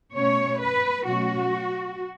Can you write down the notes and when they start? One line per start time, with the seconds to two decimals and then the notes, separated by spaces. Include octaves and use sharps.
0.15 B2 A3 C#4 C#5
0.60 B4
1.05 B2 F#3 A3 C#4 F#4